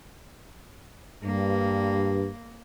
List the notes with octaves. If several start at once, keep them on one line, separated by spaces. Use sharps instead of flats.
G2 A#3